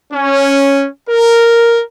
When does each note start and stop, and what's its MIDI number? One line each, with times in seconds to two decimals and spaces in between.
0.13 0.87 61
1.09 1.81 70